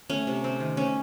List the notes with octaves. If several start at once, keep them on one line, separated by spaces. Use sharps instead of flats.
A3 C#4
C3
C4
D#3
A3 C#4